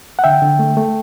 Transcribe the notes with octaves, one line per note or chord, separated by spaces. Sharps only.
F#5
D3 E5 G5
D3
A3
A3